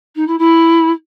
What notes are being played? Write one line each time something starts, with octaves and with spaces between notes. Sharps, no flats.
D#4
E4
E4